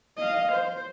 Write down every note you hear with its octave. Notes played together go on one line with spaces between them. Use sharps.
D#5 F5
C5